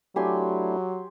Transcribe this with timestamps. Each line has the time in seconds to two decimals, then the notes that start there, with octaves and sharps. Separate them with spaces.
0.16 F#3 A3 D4 E4 G4 G#5 C6